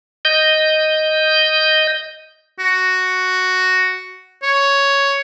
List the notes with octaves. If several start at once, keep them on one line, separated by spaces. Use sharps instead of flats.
D#5 G6
F#4
C#5